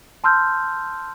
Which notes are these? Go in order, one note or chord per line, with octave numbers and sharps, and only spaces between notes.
A5 C6 E6 F6 G6